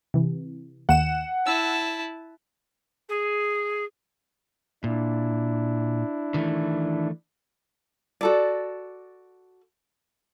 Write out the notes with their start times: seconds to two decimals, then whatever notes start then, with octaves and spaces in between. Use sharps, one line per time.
0.14 C3 E3
0.89 D#2 F#5 E7
1.47 E4 A5 E6
3.08 G#4
4.84 A#2 D4 E4
6.34 D#3 E3 A3
8.21 F#4 A4 D5